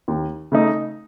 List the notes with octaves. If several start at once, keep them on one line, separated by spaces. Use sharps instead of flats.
D#2
C#3 A3 D#4